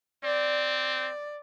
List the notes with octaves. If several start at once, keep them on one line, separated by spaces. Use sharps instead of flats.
C4 D5